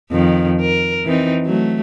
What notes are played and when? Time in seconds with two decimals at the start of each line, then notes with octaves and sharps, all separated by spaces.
0.11 F2 D#3
0.60 A#4
1.05 E3 C4 D#4
1.46 F#3 A3